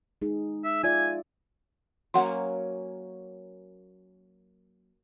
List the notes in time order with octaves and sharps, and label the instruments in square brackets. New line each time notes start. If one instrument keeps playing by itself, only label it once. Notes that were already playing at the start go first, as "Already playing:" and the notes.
[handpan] G#3 D#4 G#4
[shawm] E5
[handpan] F4 D5 E5 [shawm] G#5
[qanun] F#3 A#3 C#4 [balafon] F#5 C6